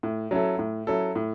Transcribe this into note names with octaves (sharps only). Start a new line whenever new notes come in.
A2
F#3 C#4 E4 A4
A2
F#3 C#4 E4 A4
A2